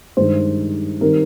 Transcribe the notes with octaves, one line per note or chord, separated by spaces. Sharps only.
G2 D#3 G#3 D#4 C5
D#3 G3 C4 D#4 A#4